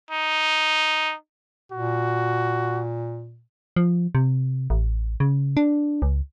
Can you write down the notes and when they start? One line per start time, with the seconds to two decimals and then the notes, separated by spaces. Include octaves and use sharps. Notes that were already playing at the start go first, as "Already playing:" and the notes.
0.11 D#4
1.72 A#2 F#4
3.76 F3
4.15 C3
4.70 A1
5.20 C#3
5.57 D4
6.02 C#2